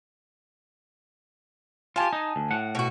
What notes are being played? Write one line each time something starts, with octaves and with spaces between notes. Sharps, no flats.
F4 G4 G#5 A5
D#4
D2
A2 F#5
B2 F#4